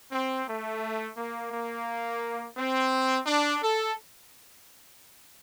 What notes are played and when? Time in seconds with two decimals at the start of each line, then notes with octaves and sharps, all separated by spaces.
0.12 C4
0.47 A3
1.17 A#3
1.52 A#3
2.58 C4
3.27 D4
3.62 A4